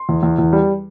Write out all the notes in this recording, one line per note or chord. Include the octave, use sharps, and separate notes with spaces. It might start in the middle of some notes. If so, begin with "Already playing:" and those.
Already playing: C6
E2
E2
E2
G3